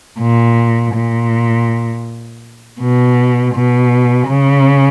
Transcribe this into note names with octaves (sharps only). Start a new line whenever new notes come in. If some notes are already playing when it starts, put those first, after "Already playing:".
A#2
A#2
B2
B2
C#3